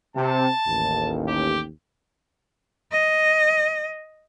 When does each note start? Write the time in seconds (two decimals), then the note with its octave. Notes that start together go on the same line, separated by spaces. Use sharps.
0.16 C3 A5
0.66 A1 D#2
1.28 G4
2.92 D#5